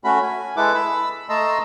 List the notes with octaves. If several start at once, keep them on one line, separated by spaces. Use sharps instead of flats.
A3 C#4 F#4 B5
G#5
G#3 E4 A4 B4 D6
B5 E6
A3 D#5 A5 A#5 C6 E6